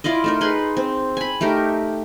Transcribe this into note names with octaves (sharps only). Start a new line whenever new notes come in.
E4 F4 D5 D#5
A3 D#4 A#4
D#4 G#4 B4 C6
C4
G#5 B5
A3 D#4 G4 A#4